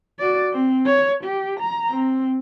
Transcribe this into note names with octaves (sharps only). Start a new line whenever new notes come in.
F#4 D5
C4
C#5
G4
A#5
C4